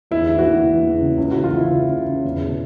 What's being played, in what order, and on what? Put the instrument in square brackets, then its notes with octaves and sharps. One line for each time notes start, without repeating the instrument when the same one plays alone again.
[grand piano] E2 E4
E3
F#4
E3
E3
E2
C#3
C#2
E3 F#4
F4
E3 E4
C#3
C#3
C#3
E2
B2